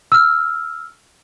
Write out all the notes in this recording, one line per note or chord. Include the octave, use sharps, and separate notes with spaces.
E6 F6